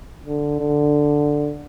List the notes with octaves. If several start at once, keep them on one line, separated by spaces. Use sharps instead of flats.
D3
D3